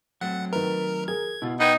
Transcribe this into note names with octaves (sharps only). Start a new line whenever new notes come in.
F#3 A3 C4 F#5
D#3 A#4 B4
G#4 A#4 G#6
B2 E4 F4
D#4 B4 F#5 G5 B5 G#6